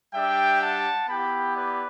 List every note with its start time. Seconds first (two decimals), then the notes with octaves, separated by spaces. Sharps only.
0.14 G3 D4 G4 E5 G5
0.62 F#5 A5
1.09 B3 E4 G4 G5 B5
1.56 B4 D5